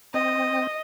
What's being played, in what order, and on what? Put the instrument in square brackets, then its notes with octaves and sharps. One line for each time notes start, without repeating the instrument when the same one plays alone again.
[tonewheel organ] C4 [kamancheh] D#5